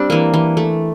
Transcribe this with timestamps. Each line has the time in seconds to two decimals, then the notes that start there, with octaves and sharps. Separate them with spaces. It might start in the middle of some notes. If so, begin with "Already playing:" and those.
Already playing: G3 C4 D4
0.10 E3 A#3
0.34 E3
0.57 A3